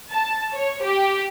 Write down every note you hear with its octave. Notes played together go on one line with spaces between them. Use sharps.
A5
C#5
G4